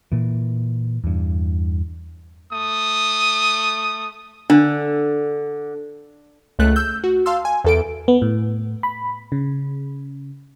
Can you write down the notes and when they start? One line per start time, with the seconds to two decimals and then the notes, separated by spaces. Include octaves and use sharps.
0.12 A#2 E3
1.04 E2 G2
2.53 A3 D#6
4.50 D3 D4
6.59 C#2 A3 F#6
6.76 E6 G6
7.04 F#4
7.26 F5 A5 C6 E6
7.45 G#5
7.64 E2 A4 D7
8.08 B3
8.22 A2
8.83 B5
9.32 C#3